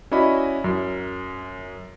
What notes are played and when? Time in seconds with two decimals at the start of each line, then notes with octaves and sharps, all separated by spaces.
0.11 C#4 E4 F#4 D5 D#5 B5
0.64 F#2